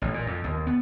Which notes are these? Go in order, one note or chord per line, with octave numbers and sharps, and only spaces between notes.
A1
A#2
F2
D#2
B3